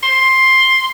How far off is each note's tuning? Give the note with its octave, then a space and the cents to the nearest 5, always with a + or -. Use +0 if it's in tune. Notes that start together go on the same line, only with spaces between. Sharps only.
C6 +10